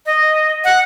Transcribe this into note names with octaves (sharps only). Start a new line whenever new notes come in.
D#5
F#5